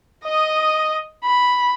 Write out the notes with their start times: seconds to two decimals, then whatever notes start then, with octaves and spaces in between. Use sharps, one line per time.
0.24 D#5 D#6
1.24 B5